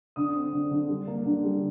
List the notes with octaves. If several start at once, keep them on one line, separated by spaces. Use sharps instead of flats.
D3 D#6
C4
D3
D3
G3
A#3
D3
G3